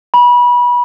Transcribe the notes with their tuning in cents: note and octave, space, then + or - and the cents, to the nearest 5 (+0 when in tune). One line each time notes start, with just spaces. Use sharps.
B5 -25